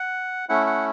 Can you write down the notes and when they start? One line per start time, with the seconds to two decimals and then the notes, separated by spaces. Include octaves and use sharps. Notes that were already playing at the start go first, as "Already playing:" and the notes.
Already playing: F#5
0.49 A3 C#4 E4 F#5
0.66 F#5